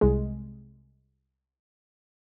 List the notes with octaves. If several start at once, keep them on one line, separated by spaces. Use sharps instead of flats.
C2 G#3